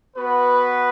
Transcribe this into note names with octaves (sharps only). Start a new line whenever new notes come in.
B3 F#4 B4